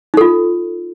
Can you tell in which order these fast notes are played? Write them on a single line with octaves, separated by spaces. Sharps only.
D#4 A4 F4